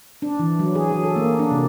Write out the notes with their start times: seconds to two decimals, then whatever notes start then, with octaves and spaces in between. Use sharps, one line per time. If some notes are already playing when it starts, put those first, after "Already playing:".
0.22 D4
0.39 E3
0.59 F#3
0.75 G#4
0.91 F#3
1.04 A4
1.16 A#3
1.39 D4
1.51 C3